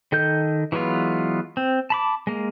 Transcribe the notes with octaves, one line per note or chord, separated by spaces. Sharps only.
D#3 A4 D#5 G6
E3 F#3 G#3 B3 F4
C4
A5 B5 D6
G#3 A#3